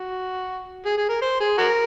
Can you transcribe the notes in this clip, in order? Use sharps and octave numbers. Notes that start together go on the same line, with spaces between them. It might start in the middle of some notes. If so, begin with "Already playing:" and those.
Already playing: F#4
G#4
G#4
A#4
C5
G#4
F#4 A#4